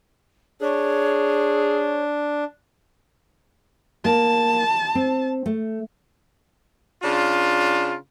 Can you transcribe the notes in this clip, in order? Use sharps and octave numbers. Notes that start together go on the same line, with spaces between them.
D4 G#4 C#5
A#3 A5
C4
A3
C#3 D4 F4